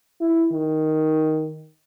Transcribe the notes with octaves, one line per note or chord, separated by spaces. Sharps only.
E4
D#3